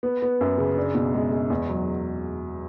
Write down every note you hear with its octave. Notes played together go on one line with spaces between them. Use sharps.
B3
B3
F#2
C#3
D4
B2
G#3
G#3
E2
F#3